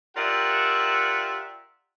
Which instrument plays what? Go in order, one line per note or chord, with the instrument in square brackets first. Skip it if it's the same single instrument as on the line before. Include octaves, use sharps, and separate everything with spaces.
[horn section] F4 G4 A#4 D5 E5 F#5